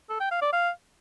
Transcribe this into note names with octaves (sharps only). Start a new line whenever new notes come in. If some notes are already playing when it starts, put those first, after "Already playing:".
A4
G5
F5
D5
F5